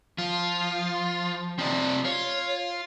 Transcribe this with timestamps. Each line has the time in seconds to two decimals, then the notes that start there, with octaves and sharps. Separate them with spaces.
0.18 F3 F4
1.59 C3 F3 C4 D5 D#5
2.05 F4 C#5